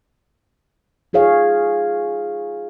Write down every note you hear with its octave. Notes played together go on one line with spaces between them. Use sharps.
D#4 F4 G#4 C#5 F5